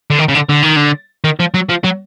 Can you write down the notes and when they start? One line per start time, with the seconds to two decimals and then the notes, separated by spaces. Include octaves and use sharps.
0.10 D3
0.19 D#3
0.28 C#3
0.34 D3
0.49 D3
0.63 D#3
0.76 D3
1.24 D#3
1.40 F3
1.54 F#3
1.69 F3
1.84 F#3